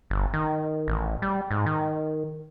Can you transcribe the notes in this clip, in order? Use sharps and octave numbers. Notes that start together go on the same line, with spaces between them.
G1
D#3
A1
G3
G#2
D#3